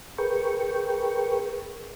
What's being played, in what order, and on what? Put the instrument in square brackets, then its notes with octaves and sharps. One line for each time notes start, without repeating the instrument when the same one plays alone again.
[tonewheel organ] G#4 A#4 B4 G5 C#6